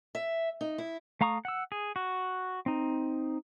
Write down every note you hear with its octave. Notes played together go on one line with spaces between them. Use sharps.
E5
D#4
E4
A3 F5 A#5 C#6 D#6
F#5 E6
G#4
F#4
C4 D#4